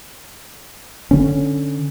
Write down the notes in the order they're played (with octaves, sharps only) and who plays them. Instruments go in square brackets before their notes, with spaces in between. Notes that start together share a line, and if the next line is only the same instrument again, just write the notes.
[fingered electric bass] D3 C#4